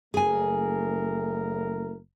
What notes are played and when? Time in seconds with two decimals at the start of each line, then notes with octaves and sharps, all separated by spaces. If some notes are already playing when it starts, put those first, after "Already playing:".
0.14 F#1 A3 G#4 A#4 G#5